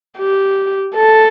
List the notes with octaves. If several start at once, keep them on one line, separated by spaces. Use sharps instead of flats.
G4
A4